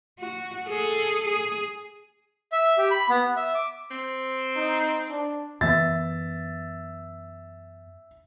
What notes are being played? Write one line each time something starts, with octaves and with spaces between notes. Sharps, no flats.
F#4
G#4 A4
G#4
E5
G4
B5
B3
E5
D6
C4
D#4
D4
F#2 E3 B3 E5 A6